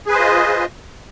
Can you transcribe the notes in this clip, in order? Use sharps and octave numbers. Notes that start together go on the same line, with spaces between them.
F4 G#4 B4 C5 D#5